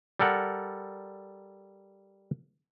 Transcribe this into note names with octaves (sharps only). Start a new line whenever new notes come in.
G3 A4 A#4 F#5